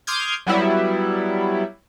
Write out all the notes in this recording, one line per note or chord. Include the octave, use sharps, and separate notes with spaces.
C6 D6 D#6 F6 G6 G#6
F#3 G3 B3 E4